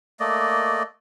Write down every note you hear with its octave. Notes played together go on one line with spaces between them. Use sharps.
A3 A#3 D5 D#5